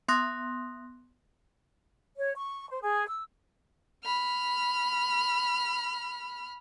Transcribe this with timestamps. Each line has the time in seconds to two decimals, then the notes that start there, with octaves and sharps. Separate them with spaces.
0.08 B3 C6 D#6 F#6 A#6
2.17 C#5
2.35 C#6
2.69 C5
2.83 G#4
3.08 E6
4.04 B5 F6